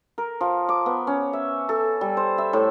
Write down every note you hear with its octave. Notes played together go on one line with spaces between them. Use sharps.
A#4
F3
D6
B3
C#4
E5
A4
G3
C5
E5
A2